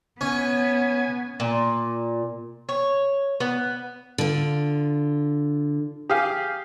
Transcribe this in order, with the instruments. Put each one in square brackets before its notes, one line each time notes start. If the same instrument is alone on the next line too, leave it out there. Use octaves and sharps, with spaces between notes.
[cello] B3 [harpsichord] C#4 [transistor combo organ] G#5
[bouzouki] A#2
C#5
B3
[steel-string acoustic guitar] D3 F4
[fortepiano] G4 G#4 F5